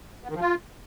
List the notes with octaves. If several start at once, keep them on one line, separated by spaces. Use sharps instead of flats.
B3
D#3
F3
F4